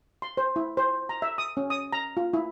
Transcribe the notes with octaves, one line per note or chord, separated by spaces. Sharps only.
C6
C5
E4
C5
A#5
E5
D#6
C#4
D#6
A#5
F4
E4